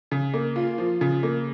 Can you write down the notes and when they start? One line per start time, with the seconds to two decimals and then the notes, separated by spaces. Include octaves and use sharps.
0.11 C#3
0.34 A#3
0.56 F4
0.78 F3
1.01 C#3
1.23 A#3